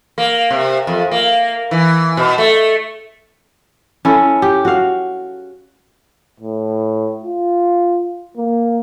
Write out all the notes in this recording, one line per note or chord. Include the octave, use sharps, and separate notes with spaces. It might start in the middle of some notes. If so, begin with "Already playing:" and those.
A#3
C3
F2
A#3
E3
B2
A3
C#4 E4 A4
G4
F#4 F5
A2
F4
A#3